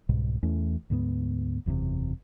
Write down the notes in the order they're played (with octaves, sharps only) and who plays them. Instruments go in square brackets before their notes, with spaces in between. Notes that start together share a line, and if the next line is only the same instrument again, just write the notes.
[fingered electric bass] C2 G#2 B2
E2 E3 A3 C#4
D2 G#2 G3 B3
F#1 E2 G#2 C3